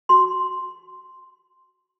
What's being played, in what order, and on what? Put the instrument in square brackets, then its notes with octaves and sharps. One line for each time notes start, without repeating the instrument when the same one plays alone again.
[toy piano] F#4 C6